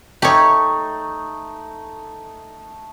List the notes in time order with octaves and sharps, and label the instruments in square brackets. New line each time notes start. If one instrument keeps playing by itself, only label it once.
[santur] A3 D#4 [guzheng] G4 C#5